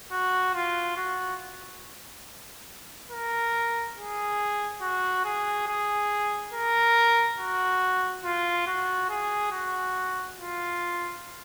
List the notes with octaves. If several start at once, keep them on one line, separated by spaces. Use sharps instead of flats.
F#4
F4
F#4
A#4
G#4
F#4
G#4
G#4
A#4
F#4
F4
F#4
G#4
F#4
F4